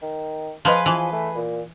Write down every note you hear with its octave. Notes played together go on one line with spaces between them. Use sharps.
D#3
F3 G#4 B4 D#5
E3 F3
A3
A#2